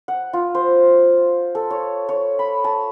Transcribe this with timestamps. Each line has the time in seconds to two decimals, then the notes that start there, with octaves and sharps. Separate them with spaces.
0.08 F#5
0.33 F4
0.55 C5
1.55 A4
1.70 C#5
2.09 C#5
2.39 B5
2.64 A5